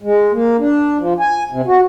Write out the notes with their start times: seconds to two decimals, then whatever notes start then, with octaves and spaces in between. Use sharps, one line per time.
0.02 G#3
0.32 A#3
0.59 D4
0.98 F3
1.20 G#5
1.51 C3
1.66 F#4